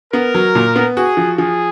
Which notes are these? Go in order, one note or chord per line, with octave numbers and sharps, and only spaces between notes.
B3 A#4
F#3
A#2
B3
F#4 G#4
F3
F3 G#4